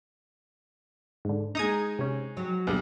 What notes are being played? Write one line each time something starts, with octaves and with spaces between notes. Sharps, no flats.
G#2 D3
G#3 D#4 A#5 D#6 G#6
C3 C#4
F#3
D2 B2 G3